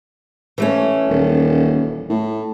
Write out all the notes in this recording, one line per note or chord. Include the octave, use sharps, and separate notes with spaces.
E3 A3 C#4
D#1
A2